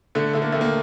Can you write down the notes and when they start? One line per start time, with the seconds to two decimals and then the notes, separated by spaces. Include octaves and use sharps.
0.15 D3 A3
0.33 D3 A3
0.42 A#3
0.52 A3
0.55 D#2
0.61 A#3